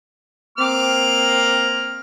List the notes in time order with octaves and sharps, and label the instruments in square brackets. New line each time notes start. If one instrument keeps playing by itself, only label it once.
[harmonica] A#3 D6 F6 [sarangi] C4